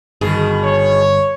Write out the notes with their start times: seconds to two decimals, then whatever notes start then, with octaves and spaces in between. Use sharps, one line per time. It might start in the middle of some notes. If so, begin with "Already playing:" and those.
0.21 G1 B2 D#3 G#4
0.64 C#5